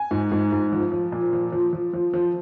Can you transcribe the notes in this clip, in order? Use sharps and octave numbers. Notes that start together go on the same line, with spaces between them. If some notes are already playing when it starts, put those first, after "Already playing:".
Already playing: G#5
G#2
G#2
G#2
F3
F3
A#2
F3
F3
F3
F3
F3